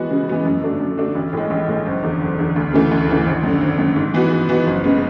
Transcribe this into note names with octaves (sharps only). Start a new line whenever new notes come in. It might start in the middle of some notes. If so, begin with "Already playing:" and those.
Already playing: E3 G#3 B3 F#4
C#3
E3 G#3 B3 F#4
F#2
D3 A3 D4 F#4
F#2
D3 A3 D4 F#4
A1
A2 G#3
A1
A2 G#3
F#1
E2 D3
F#1
E2 D3
D2
C#3 E3 A3
D2
C#3 E3 A3
G#1
F#2 D3
G#1
F#2 D3
G#2
E3 B3 F#4
G#2
E3 B3 F#4
F#1
C#3 G#3 B3